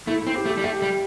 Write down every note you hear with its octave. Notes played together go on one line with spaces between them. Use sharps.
A3 E4
E4
C4
G4
A3
G4
G3
A3 G4
G3